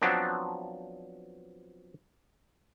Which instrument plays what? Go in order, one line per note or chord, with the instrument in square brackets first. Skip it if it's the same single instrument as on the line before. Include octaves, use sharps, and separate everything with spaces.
[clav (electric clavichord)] F3 F#3 B3 C4 D4